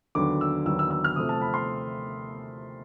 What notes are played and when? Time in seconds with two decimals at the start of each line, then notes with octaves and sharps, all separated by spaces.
0.15 D#2 D3 F#3 B3 D6
0.41 E6
0.66 D#2 D3 F#3 B3 E6
0.79 E6
0.91 E6
1.04 F6
1.16 C3 F3 A3 C4 D#6
1.29 A5
1.42 B5
1.54 C6